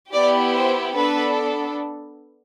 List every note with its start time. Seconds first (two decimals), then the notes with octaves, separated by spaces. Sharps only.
0.13 B3 E4 G4 D5
0.54 C5
0.95 B3 D4 A4 B4